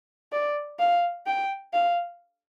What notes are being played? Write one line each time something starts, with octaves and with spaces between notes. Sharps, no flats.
D5
F5
G5
F5